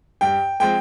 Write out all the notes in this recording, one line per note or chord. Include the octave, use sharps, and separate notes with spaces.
G2 G5
F3 G#3 C4 G5